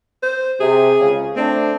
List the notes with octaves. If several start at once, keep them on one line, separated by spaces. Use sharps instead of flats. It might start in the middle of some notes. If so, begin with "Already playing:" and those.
C5
C3 G#4
C#2 C#3
A3 C4 D4